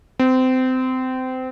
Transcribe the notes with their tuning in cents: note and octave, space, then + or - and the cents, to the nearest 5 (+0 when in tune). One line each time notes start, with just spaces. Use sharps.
C4 -25